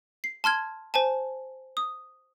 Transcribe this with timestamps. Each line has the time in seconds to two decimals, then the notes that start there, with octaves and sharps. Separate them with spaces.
0.24 C7
0.44 A5 C6 F6 G#6
0.94 C5 G#5 A5
1.77 D#6